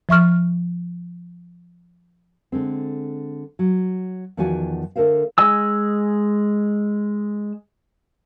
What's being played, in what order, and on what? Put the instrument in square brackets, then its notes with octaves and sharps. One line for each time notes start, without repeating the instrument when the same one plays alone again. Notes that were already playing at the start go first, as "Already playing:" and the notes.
[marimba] F3 E5 C#6 F6
[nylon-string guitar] D3 G#3 C4
F#3
E2 D#3 F3 F#4 D5 G#5
D3 A3 A#4 C5 F5
[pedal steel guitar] G#3 D#5 G#5 E6